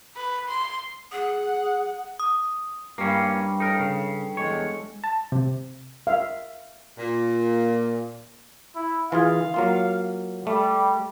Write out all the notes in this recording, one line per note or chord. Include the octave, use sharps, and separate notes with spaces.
B4
C6
G#4 F#5
D#6
G2 G3 A#3 C#4
D#4 A4 A#4 C#5
C#3
E2 G#3 A4 C#5
A5
C3
E5 F5
A#2
E4
E3 F4 G#4 F5
F#3 A#3 F4
G3 A3